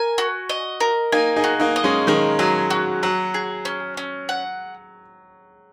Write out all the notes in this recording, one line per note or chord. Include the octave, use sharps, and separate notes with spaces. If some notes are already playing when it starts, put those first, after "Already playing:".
Already playing: A#4 G#5
F#4
D#5
A#4
A#3 D#4 G#5
D#4 G#4
F#4
A#3 D#4
D#5
G#3 C#4
D#3 G#3 A#4
F#3 G#5
F#4
F#3 F#5
G#4
C#4
C#4
F#5